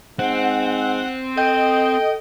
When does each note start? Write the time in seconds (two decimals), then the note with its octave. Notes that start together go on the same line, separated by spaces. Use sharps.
0.19 G#2 C4 F#5
1.37 A4 D#5 G5